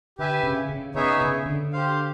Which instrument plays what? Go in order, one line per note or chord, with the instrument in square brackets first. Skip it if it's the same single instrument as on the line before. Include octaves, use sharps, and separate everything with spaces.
[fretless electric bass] D3 [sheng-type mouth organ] G4 B4 E5 G#5
[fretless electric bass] C#3
C#3
[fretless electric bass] C#3 [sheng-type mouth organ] B3 D#4 G#4 C#5 E5
[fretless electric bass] C#3
D3
[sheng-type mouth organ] G4 C5 F5